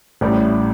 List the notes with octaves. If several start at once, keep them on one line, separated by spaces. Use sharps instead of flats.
A1 A2 G3